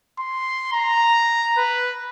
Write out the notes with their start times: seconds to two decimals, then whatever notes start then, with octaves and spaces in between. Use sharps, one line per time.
0.19 C6
0.73 A#5
1.57 B4